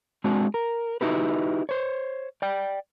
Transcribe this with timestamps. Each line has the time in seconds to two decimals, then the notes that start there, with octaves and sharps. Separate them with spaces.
0.24 G#3 C4 D4 F#4
0.54 A#4
1.01 D#4 E4 F#4 G4 B4
1.69 C5 C#5
2.42 D5 G5